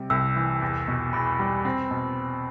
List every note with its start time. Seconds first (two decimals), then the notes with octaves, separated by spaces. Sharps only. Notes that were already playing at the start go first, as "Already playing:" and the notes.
Already playing: C3 G3
0.10 C2 E6
0.36 E3
0.62 E2
0.88 B2
1.13 E2 B5
1.39 G3
1.65 C4
1.91 B2